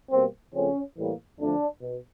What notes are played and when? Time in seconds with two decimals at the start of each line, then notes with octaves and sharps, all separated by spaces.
0.11 B2 G3 A#3 C4
0.53 C#3 F3 A3 C4 C#4
0.96 A2 E3 G3 A#3
1.38 F2 D3 F3 A3 D4
1.81 B2